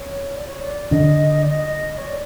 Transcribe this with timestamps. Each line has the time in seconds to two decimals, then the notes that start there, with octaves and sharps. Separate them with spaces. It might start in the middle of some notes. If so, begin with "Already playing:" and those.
Already playing: C#5
0.34 D5
0.46 C#5
0.60 D5
0.91 D3 D4 D#5
1.43 D5
1.49 D#5
1.97 C#5
2.07 D5